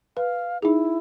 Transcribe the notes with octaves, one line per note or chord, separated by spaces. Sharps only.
B4 F5
D#4 E4 G#4